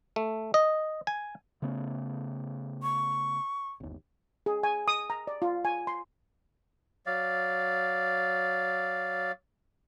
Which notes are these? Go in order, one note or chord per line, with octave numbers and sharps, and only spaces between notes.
A3
D#5
G#5
C#3 A3 B3
C#6
G1 D#2
G#4
G#5
D#6
A#5
D5
F4
G#5
C6
F#3 D5 F5